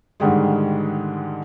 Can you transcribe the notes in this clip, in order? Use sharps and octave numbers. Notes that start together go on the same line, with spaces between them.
G#2 D3 D#3 G3 G#3